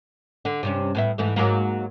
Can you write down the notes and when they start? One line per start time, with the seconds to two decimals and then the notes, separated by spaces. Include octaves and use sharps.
0.45 D3
0.63 G2 C3 C#4
0.95 A2 B3 E4
1.18 G#2 E3 A3
1.36 G#2 F#3 A#3